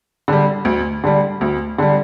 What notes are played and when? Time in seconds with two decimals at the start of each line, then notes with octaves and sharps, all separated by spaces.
0.28 D3 G3
0.65 D2
1.04 D3 G3
1.41 D2
1.78 D3 G3